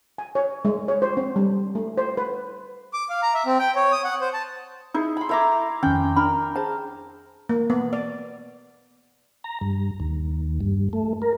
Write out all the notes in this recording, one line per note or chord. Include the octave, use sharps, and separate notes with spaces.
G#5
C#5
G#3
C#5
C5
C4
G3
A3
C5
B4
D6
F5
A#5
E5
C4
G5
C#5
D#6
F#5
C5
A5
D#4 E4 G#4
B5 C6
E4 A4 E5 A#5 C6 D6 G6 G#6
F2 D#3 C#4 G5
D4 A#4 B5
G#4 C5 A5
A#3
B3
D5
A#5
G2
D#2
G2
A3
A#4